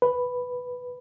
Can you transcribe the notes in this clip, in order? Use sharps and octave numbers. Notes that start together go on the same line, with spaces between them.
B4